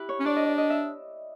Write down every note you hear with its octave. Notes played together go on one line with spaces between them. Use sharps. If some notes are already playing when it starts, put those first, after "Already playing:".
Already playing: E4 G4 B4
C#5
C#4
D4 D5
D#5
D5
D#5
E5